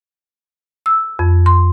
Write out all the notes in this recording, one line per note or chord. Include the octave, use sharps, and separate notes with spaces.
E6
F2
C6